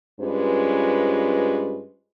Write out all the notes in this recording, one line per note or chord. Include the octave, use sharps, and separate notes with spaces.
G2 G#3 C#4 F4 B4 C5